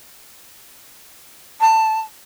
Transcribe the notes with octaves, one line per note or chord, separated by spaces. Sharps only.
A5